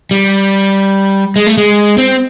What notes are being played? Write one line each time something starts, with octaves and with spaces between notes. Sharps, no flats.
G3
G#3
A3
G#3
C4